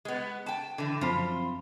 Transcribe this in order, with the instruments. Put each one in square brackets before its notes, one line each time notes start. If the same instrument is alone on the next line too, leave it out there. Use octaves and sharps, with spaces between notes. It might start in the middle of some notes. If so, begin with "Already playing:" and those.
[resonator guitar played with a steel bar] G#3 B3
G5 A5
D3 E3
[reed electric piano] F#2 C4 B5 [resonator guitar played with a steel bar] F3 F4